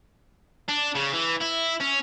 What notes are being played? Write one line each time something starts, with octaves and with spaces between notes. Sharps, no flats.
D4
C#3
E3
E4
C#4